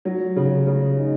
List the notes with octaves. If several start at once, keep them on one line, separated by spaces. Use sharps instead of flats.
F#3
C#3
C#3
D#4